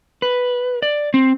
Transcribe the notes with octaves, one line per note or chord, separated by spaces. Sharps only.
B4
D5
C4